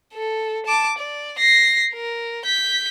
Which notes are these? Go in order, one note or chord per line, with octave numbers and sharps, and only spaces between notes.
A4
A5 D6
D5
A#6 C7
A#4
G6 B6